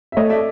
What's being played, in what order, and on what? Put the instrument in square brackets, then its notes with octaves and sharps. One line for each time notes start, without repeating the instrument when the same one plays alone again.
[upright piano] E5
[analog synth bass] A3 [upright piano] C#5 D#5
[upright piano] D5 E5